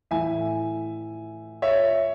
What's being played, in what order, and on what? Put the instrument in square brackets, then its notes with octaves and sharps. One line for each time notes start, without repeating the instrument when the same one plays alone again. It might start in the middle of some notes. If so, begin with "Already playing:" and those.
[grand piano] A2 E3 E5 G#5
C#5 E5